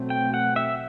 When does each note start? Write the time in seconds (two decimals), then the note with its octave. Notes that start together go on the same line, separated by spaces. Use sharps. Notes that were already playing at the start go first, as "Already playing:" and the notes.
Already playing: B2 F#3 A3 C4
0.10 G5
0.34 F#5
0.56 E5